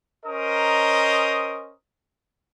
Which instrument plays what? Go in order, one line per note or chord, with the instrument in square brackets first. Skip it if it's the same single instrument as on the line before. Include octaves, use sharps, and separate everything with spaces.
[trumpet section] C#4 A#4 C5 D#5 A#5 D#6